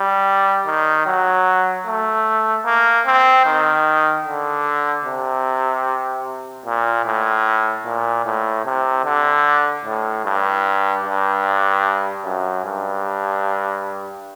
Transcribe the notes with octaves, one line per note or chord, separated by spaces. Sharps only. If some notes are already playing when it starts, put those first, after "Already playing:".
Already playing: G3
D#3
F#3
A3
A#3
C4
D#3
D3
C3
A#2
A2
A#2
A2
C3
D3
A2
G2
G2
F#2
G2